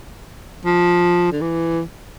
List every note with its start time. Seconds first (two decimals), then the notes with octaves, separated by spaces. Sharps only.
0.65 F3
1.32 D3
1.41 E3